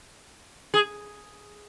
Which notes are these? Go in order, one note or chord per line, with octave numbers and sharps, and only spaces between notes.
G#4